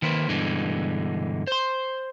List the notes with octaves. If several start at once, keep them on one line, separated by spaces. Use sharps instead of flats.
D#3 A#3 B4 C5
G2 B2 D3 E3 G#3
C5 C6